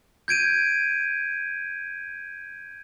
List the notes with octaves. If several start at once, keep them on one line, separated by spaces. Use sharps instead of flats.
G6 G#6 D7 D#7